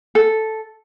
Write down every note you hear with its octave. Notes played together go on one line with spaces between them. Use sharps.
A4